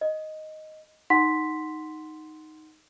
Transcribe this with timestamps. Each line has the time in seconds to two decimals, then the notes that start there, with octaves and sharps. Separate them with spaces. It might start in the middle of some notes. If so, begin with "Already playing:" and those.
0.01 D#5
1.10 D#4 F#5 C6 B6